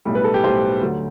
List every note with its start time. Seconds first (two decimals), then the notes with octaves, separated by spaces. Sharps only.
0.05 B1 A2 G3
0.15 B4
0.24 A4
0.34 G4
0.44 B1 A2 G3 C5
0.81 D2 D3 F#3